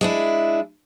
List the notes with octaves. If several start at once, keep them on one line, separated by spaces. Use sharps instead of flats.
G#3 D4 E4